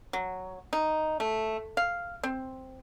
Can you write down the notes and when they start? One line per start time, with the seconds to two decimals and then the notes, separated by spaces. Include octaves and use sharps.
0.13 F#3
0.73 D#4
1.20 A3
1.77 F5
2.23 C4